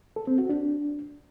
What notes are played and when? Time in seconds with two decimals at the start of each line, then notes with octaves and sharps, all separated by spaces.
0.16 A4
0.27 C4
0.38 F#4
0.49 D4